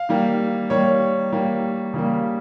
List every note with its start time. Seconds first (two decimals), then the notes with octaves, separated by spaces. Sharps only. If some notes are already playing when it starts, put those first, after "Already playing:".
Already playing: F5
0.09 D#3 G3 A#3
0.70 D#3 G3 A#3 C#5
1.32 D#3 G3 A#3
1.94 C#3 G3 A#3